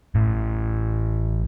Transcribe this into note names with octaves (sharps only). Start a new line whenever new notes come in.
A1 A2